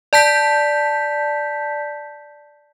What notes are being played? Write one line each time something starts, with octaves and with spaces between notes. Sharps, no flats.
D5 A5 G6 B6